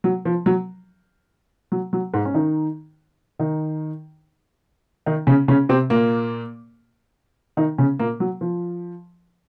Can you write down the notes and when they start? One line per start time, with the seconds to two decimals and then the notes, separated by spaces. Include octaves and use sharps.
0.04 F#3
0.25 F3
0.46 F#3
1.72 F#3
1.93 F#3
2.14 G#2 G#3
2.25 C#4
2.34 D#3 D#4
3.39 D#3 D#4
5.06 D#3 D#4
5.27 C#3 C#4
5.48 C#3 C#4
5.69 C3 C4
5.90 A#2 A#3
7.57 D#3 D#4
7.78 C#3 C#4
7.99 A#2 A#3
8.20 F#3
8.41 F3